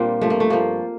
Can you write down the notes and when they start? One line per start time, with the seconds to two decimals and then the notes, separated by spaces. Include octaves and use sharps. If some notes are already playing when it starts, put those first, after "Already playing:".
Already playing: A#2 G3 A#3 C4 D4
0.21 G2 F3 A3
0.30 A#3
0.40 A3
0.50 G2 F3 A#3